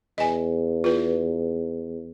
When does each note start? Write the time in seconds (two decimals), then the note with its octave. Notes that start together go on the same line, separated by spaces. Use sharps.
0.18 E2 D#5 G#5
0.84 F4 B4